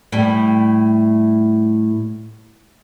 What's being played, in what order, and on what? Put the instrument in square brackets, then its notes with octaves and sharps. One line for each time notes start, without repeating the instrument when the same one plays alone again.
[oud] A2 G3